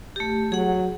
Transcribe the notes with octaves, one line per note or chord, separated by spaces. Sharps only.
A3 G4
F#3 G#4 F#5